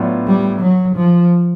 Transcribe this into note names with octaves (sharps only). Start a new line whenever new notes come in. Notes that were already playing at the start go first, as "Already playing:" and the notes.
Already playing: A2 F#3 B3 D4 F4
G3
F#3
F3